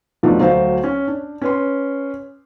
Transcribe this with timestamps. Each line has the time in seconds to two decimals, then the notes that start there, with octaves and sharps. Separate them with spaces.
0.23 E2 F3 F#3 A3 D4 D#4
0.39 D2 F#3 C5 F5
0.84 C#4
1.07 D4
1.42 C#4 B4 C6